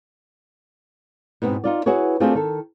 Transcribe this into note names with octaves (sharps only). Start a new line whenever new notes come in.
G#2 B2 B3 C4
D#4 F4 D5
E4 F#4 G#4 B4 C#5
A3 C4 D4 F4 G4 G#4
D#3 A4